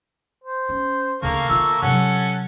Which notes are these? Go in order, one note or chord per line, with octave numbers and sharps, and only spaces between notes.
C5
C#4
D2 C#3 A#3 A4 F5 C#6
D3 F4 E5
C3 F#3 C#4 A4 F#5